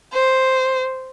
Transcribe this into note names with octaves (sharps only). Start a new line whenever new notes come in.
C5